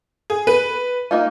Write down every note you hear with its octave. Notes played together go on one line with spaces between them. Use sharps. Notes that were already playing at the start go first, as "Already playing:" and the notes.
G#4
B4
A#3 D#4 F4